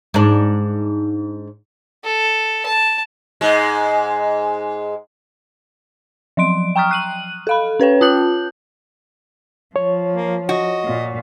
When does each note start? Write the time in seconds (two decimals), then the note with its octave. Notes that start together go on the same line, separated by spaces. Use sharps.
0.14 G#2 D4
2.04 A4
2.65 A5
3.41 G#2 G#3
6.37 F3 F#3 C6 D7
6.76 G5 A#5 C#6 D#6 F6
6.91 F#6 D#7 F#7
7.47 A4 F5 B5
7.79 C#4 B4 C#5 G5
8.01 F4 A5 D#6 F#6 G6 F#7
9.76 F3 C#5
10.15 A#3
10.49 F#4 D#5
10.83 A#2 F4